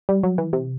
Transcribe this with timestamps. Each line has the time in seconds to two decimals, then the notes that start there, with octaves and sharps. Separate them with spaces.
0.09 G3
0.24 F#3
0.38 E3
0.53 C3